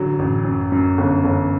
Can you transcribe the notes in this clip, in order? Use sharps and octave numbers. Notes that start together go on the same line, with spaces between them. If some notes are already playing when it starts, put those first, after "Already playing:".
Already playing: A1 D3 F#3
A1
F#2
F#2
G1
G1